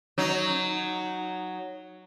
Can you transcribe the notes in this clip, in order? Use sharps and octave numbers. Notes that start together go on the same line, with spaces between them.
F#3 D#4